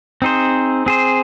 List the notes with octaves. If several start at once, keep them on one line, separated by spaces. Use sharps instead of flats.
C4 D#4 G#4 C5
C4 G#4 C5